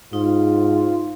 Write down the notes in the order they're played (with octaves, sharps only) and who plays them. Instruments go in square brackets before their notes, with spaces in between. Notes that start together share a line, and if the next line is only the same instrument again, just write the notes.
[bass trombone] G#2 [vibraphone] D#4 [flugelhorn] F4